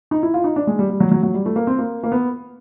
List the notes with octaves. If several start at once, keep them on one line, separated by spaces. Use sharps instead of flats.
D#4
E4
F4
D#4
D4
G#3
G3
G3
F#3
F#3
F#3
G3
A3
A#3
C4
A#3
A#3
B3